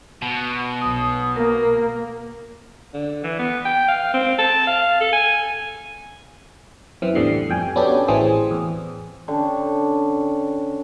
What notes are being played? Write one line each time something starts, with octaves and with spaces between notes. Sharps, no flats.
B2
B1 D#6
A#3 A#4
D3
E3
B3
G5
F5
C4
A5
F5
A4
G#5
F#2 E3 C4
A1 E2 D3 G3 C7
F2 G5 G#5
B3 C#4 D4 F#4 G4 A4
A1 A2 E3 C4 G#4
E2
D3 C#4 G5